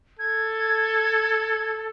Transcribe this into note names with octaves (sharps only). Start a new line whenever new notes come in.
A4 G#6